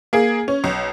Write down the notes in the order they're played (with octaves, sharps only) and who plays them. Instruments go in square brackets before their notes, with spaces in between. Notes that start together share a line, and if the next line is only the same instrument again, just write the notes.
[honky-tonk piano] A#3 G#4
C#4
B1